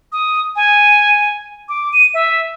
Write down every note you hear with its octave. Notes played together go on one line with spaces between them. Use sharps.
D#6
G#5
D6
D#7
E5